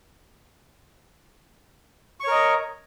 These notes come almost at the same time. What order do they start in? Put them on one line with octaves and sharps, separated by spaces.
C#6 C#5 A#4 D#5